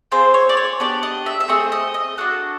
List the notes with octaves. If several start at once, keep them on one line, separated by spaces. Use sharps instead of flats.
C4 F4 G#4 C5
C#5
D5
C#5
B3 D4 G4 D5
D#5
E5
E5
A3 C4 G#4 D#5
D#5
D#5
D4 F#4 A4 F#5